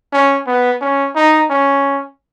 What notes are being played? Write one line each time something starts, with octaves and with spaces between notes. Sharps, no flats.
C#4
B3
C#4
D#4
C#4